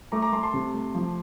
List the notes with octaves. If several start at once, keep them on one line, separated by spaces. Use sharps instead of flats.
A3 A#5 D6
A#5 D6
A3 A5 C6
A5 C6
C3
A3
F3